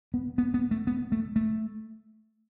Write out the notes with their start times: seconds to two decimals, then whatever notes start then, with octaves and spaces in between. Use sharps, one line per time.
0.14 B3
0.38 B3
0.54 B3
0.71 A3
0.87 B3
1.12 A3
1.36 A3